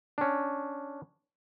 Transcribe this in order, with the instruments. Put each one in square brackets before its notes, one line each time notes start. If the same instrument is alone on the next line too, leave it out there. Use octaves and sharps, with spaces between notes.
[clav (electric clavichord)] C#4 D4